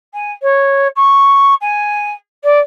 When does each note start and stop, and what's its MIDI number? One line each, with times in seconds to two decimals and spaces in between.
0.13 0.31 80
0.42 0.88 73
0.96 1.54 85
1.61 2.12 80
2.44 2.59 74